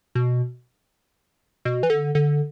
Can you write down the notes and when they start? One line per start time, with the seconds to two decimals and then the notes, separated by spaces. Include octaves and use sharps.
0.15 B2
1.65 B2
1.83 E3
1.90 D3
2.15 D3